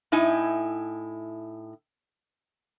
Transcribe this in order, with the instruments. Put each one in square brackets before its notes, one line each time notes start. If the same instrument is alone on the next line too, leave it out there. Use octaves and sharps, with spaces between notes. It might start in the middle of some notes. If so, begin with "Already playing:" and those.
[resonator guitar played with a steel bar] A2 D#4 E4 G#5